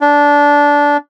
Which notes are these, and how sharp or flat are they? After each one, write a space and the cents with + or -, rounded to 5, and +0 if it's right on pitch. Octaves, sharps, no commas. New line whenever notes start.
D4 -15